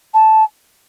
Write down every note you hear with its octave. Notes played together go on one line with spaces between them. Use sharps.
A5